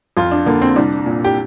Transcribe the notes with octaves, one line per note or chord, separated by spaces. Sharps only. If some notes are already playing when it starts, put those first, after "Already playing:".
F2 F4
D4
D3 A#3
C4
C2 D4
A#2
G4